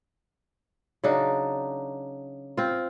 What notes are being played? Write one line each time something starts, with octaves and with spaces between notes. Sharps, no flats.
C#3 F#3 D4 D#4
C4 F4